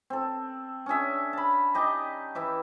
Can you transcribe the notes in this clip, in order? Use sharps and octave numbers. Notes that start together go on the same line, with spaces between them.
C4 A4
C#4 D4 G#4 E5
A5 B5
D#4 G4 D#5
E3 E5 D6